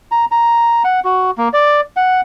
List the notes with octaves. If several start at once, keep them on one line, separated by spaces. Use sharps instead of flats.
A#5
A#5
F#5
F#4
A#3
D5
F#5